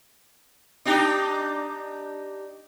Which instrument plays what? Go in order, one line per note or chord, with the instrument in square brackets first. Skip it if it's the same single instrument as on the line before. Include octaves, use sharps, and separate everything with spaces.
[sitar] D4 D#4 G4